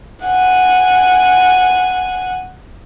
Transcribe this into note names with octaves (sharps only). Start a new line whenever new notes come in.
F#5 G#5